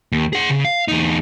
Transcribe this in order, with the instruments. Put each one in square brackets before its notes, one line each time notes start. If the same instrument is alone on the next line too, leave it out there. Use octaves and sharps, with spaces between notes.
[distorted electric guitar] D#2
G#4 F#5
C#3
F5
E2 D#4